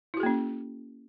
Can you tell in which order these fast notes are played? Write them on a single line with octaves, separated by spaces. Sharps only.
E4 F#4 G#4 A#3 C#4